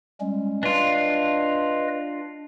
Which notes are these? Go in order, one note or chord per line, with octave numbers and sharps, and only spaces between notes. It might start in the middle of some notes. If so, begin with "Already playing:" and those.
G3 G#3 C#4
D4 F4 B4 D#5